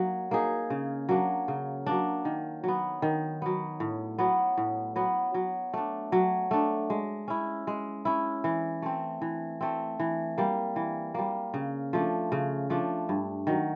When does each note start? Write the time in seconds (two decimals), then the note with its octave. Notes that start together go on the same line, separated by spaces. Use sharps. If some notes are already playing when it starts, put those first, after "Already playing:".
Already playing: F#3 A#3 D#4
0.31 A#3 D#4 G#4
0.70 C#3
1.09 F#3 A#3 D4
1.48 C#3
1.86 F#3 A#3 D4
2.25 D#3
2.64 F#3 B3
3.02 D#3
3.42 F#3 B3
3.80 A2
4.18 F#3 B3
4.58 A2
4.96 F#3 B3
5.34 F#3
5.74 A3 D4
6.12 F#3
6.51 A3 D4
6.90 G#3
7.28 C#4 E4
7.67 G#3
8.05 C#4 E4
8.44 E3
8.82 A3 C4
9.22 E3
9.61 A3 C4
10.00 E3
10.38 G3 A#3
10.76 E3
11.15 G3 A#3
11.54 C#3
11.93 F3 A3 D4
12.32 C#3
12.70 F3 A3 D4
13.09 G2
13.47 D#3 F#3